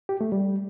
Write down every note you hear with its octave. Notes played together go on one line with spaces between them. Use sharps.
G4
A3
G3